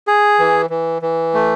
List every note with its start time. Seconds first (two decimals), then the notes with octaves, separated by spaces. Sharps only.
0.08 G#4
0.39 E3
0.70 E3
1.02 E3
1.34 A3